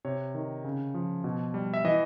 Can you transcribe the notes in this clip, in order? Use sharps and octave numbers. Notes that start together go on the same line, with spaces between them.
C3 C#5
D#3
C#3
F3
B2
G3
E5
E3 D#5